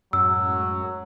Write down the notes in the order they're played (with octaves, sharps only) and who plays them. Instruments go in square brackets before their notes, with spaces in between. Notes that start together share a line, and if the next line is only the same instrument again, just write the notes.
[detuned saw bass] F#2 [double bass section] A2 G#3 [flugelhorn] F#3 [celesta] E6